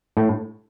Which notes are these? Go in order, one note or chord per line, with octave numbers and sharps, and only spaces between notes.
A2